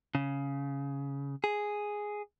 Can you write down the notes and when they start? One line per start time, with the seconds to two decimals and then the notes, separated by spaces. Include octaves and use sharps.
0.15 C#3
1.44 G#4